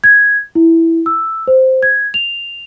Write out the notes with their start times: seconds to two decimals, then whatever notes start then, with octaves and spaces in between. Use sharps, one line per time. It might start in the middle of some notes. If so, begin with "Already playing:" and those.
0.04 G#6
0.55 E4
1.06 E6
1.47 C5
1.83 G#6
2.14 F7